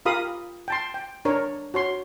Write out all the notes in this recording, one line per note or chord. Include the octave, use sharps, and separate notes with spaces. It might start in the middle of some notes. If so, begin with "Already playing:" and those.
F4 G4 A#4 F5 B5 D#6
G5 A5 C6
G5
D4 A#4 C#5
F#4 C#5 C6